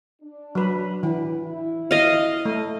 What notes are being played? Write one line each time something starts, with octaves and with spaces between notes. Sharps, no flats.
D4
F#3 B4
E3
E4
D#5 F5
A3